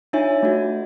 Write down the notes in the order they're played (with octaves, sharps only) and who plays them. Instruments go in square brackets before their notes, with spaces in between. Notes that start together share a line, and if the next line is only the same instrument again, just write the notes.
[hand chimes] D4 D#4 F4 C#5 E5 G#5
A3 F#4